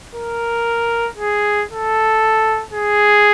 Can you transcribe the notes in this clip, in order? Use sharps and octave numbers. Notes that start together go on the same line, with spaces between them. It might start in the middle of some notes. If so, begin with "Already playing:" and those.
A#4
G#4
A4
G#4